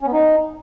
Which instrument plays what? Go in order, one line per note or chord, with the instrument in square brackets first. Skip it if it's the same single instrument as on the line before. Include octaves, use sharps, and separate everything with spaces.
[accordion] C#4
B3
D#4